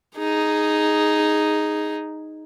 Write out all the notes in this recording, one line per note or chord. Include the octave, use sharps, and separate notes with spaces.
D#4 G#4